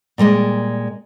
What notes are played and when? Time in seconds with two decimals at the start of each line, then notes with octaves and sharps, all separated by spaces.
0.18 A#2 G3 G#3 A#3